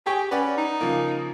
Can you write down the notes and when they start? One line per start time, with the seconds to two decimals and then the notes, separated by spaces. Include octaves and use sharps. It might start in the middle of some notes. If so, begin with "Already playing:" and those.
0.06 G4 G#4 G5 C#6
0.31 C#4 B4 D5 F#5
0.57 D#4
0.81 C#3 F3 A#3